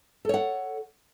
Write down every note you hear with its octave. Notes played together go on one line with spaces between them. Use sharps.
A4 C#5 F#5